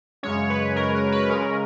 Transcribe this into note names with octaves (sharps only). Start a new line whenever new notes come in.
F#2 C#3 G#3 C#4 C#5
B4
A#4
A#4
B4
C#3 G#3 C#4 A#4